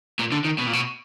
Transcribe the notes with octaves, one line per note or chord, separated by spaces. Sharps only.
A#2
D3
D#3
B2
A#2
B2